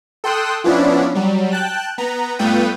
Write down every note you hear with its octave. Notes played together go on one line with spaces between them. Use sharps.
A4 G5 C6 D#6 F#6 E7
F3 B3 C#4 D4 E4
F#3 G3
G5 A5 F#6
B3 A#5
G2 A3 B3 F4 G5 D#7